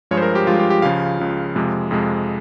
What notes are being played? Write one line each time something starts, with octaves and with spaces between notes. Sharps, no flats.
G2 F3 G#3 C#5
C5
A#4
G4
G2 F3 G#3 F4
G4
G4
C#2 C#3 F3 F5
C#2 C#3 F3
F2 C3 F3 G#3
F2 C3 F3 G#3